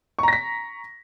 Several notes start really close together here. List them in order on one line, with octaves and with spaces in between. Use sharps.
C#6 A#5 A#6 B6